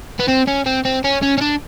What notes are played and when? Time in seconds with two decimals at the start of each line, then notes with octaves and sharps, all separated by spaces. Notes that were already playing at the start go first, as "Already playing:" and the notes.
0.19 B3
0.28 C4
0.47 C#4
0.66 C4
0.85 C4
1.04 C#4
1.22 C#4
1.38 C#4
1.41 D4